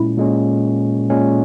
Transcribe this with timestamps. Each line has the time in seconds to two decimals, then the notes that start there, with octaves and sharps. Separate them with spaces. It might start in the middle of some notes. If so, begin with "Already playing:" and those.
Already playing: A#2 G#3 C#4 E4
0.18 A#2 G#3 C#4
1.10 A#2 G#3 C#4